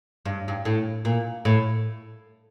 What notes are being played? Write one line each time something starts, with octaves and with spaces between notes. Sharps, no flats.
G2
G2
A2
A#2
A2